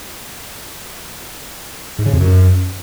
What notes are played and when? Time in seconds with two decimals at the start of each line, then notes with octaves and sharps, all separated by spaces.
1.99 G#2
2.06 C#3
2.13 F2
2.20 F#2